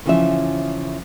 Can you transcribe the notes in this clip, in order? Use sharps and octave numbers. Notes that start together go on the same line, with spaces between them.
C#3 E3 F3 E4 E5